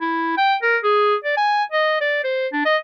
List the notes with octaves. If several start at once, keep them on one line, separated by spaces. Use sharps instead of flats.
E4
G5
A#4
G#4
D5
G#5
D#5
D5
C5
D4
D#5